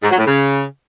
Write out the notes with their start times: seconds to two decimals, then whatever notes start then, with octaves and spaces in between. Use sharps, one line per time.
0.02 G#2
0.10 F#3
0.18 A2
0.25 C#3